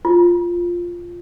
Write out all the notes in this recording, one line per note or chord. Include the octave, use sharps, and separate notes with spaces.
F4